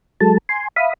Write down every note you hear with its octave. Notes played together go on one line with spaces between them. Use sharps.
F#3 G#3 A4 A5
G#5 C6
E5 F5 B5 D#6